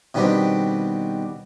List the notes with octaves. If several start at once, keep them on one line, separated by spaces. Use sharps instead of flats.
B2 D#3 G3 B3 C4 D4